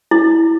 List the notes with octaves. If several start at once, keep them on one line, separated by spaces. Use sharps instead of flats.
E4